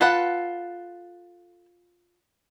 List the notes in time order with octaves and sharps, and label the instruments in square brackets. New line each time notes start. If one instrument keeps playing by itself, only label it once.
[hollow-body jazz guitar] F4 [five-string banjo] A4 B4 F#5